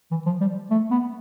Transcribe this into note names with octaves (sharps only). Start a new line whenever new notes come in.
E3
F3
G3
A3
B3